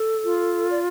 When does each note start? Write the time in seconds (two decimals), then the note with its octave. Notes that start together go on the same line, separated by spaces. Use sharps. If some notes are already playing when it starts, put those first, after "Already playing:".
Already playing: A4
0.24 F4
0.70 D5